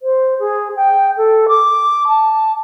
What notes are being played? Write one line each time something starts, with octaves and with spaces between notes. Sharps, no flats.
C5
G#4
G5
A4
D6
A5